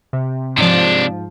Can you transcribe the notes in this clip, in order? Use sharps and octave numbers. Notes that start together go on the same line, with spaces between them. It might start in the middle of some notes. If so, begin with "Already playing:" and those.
C3
G#2 C3 F3 D4